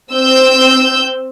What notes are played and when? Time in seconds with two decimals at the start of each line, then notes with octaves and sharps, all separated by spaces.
0.12 C4 E6 G6